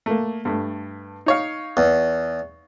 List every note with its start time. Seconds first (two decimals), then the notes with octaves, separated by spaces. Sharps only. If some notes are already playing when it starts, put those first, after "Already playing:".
0.06 A3 A#3
0.45 G2 A3
1.26 D#4 C#5 F5
1.77 E2